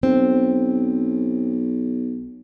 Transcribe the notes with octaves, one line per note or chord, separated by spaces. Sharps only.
B1 C4